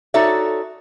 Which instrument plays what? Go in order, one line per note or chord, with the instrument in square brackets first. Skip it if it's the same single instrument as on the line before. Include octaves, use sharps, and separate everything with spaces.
[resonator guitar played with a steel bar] D#4 F#4 A4 C#5 D5 E5